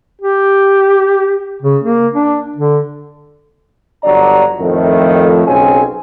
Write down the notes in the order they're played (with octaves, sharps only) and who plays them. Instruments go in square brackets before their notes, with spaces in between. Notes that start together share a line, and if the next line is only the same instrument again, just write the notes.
[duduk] G4
C#3
A#3
D4
D3
[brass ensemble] G1 F#3 D4 D5 A#5
F2 A2 D#3 F3 A3
B1 C#3 C4 C#4 G#5